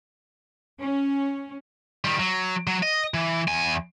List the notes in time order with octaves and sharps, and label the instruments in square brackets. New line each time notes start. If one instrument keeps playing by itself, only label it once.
[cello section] C#4
[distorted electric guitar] D#3 G3
F#3
F#3
D#5
E3
E2 G#5